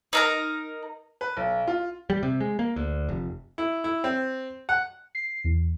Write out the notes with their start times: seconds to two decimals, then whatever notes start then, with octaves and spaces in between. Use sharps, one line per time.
0.13 D#4 A#4 A#5
1.21 B4
1.37 B1
1.68 F4
2.10 G3
2.23 C3
2.40 G#3
2.59 A#3
2.76 D2
3.09 F1
3.58 E4
3.84 E4
4.04 C4
4.69 F#5
5.15 C7
5.44 E2